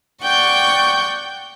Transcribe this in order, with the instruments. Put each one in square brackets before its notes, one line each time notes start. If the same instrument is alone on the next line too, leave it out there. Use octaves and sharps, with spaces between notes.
[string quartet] D5 F#5 G5 C#6 G6